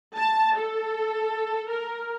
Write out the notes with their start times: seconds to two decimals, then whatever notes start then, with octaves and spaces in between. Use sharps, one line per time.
0.17 A5
0.56 A4
1.69 A#4